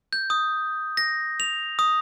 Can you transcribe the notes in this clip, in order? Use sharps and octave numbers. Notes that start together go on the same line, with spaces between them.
G6
D#6
A#6
F7
D#6